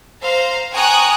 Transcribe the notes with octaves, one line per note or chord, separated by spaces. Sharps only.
C5 F5 A#5
G5 G#5 A#5 C#6 D#6 F#6